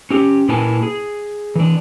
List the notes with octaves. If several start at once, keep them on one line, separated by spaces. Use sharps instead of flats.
C#4 G4
A#2 A#3 E4 B4 G#5 A5
G#4
E3 D4